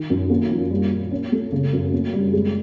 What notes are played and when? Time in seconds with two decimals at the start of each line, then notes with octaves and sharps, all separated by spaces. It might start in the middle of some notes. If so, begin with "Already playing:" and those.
Already playing: D#3
0.10 F#2
0.30 A#3
0.50 F3
0.70 G3
0.91 A#2
1.11 C#4
1.32 A3
1.52 C#3
1.73 F#2
1.93 A#3
2.13 G3
2.33 G#3